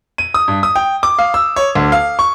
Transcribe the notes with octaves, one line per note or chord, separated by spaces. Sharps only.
D#7
D#6
G2
D#6
G5
D6
F5
E6
C#5
D2
F5
C#6